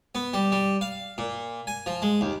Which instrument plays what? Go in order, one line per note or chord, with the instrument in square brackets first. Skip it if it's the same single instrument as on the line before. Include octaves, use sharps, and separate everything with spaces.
[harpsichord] B3
G3
G3
F5
A#2
G#5
F3
G#3
D#2